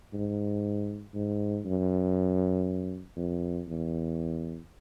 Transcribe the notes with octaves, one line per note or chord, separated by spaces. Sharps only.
G#2
G#2
F#2
F2
E2